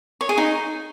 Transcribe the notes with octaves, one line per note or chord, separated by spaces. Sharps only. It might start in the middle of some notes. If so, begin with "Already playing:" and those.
C#5
G#4
D#4